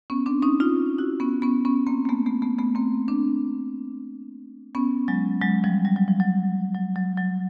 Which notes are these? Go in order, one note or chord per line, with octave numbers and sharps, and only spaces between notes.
B3 C#4
C4 D4
C#4 D#4
D#4 F4
E4 F#4
B3 C#4
B3 C#4
B3 C#4
A#3 C4
A#3
A3 B3
A3 B3
A3 B3
A3 B3
A#3 C4
C4 D4
B3 C#4
F#3 G#3
F#3 G#3
F3 G3
G3
F#3
F3
F#3
F#3
F#3
F#3